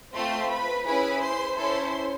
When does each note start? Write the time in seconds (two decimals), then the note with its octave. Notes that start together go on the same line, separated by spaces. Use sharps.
0.14 A3 C4 F4 C5 C6
0.50 B4 B5
0.86 C#4 E4 G#4 B4 B5
1.23 C5 C6
1.58 C#4 E4 A4 C5 C6